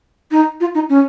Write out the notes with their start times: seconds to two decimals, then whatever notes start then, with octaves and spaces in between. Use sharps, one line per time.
0.31 D#4
0.60 F4
0.74 D#4
0.89 C#4